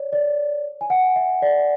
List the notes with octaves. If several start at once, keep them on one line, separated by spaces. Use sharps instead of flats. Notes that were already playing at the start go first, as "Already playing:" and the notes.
Already playing: C#5 D5
D5
G#5
F#5
E5
D5